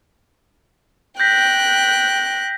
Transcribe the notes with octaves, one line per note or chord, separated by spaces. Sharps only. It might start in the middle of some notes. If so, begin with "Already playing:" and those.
G5 F#6 G6 A#6 B6